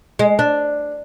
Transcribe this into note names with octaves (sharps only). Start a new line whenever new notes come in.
G#3
D4